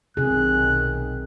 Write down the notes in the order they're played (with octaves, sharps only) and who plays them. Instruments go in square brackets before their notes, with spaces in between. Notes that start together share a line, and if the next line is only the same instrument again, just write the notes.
[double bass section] B1 D#3 [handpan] C3 G#4 [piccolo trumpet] F#6